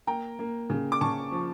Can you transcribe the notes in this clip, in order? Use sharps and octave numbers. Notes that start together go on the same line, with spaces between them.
A#3 G5 A#5
A#3
C#3
D6
C#3 A5 C#6
F3